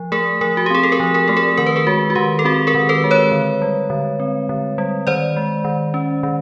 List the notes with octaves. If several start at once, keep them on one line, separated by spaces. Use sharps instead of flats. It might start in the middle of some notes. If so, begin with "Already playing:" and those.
Already playing: F3
A3 G#4 A#4
F3 G#4 A#4
F#4
G4
C4 G#4
A4
G#4 A#4
F3
G#4 A#4
A3 A4
G#4 A#4
D#3 A#4
B4
G#4 A#4
G#3 F#4
F#4
D#3 G4
A4
C4 F#4 G#4
G#4 A#4
D#3
A4 B4
G#3
B4 C#5
D3
G3
D3
C4
D3
G3
D#3 C5 D5
G#3
D#3
C#4
D#3